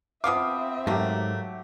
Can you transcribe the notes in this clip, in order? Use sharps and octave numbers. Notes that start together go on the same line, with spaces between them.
F3 B3 C4 E5 F5 D6 D#6
G#2 F#3 A3 A#3 G4